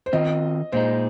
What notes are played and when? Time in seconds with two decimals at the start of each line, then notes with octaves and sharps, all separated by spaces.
0.06 C5
0.13 D#3 C4 F4 D#5
0.72 A#2 G#3 D#4 C5